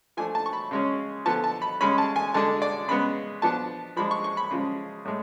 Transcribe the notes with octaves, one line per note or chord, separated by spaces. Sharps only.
F3 A3 D4 G#5
A5
C#6
B5
C#3 G#3 C#4
D3 F3 B3 A5
A5
B5
C#3 G#3 C#4 B5
A5
G#5
D3 G#3 D4 A5
D5
C#3 G#3 B3 B5
F3 B3 D4 A5
F3 G#3 D4 B5
C#6
C#6
B5
C#3 F3 G#3
A2 G#3